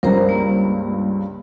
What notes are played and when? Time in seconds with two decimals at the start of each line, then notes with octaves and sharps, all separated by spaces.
0.03 C#2 G2 A#4 C5 A#5
0.29 A#3